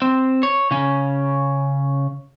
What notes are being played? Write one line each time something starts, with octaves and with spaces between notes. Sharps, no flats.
C4
C#5
C#3 C#4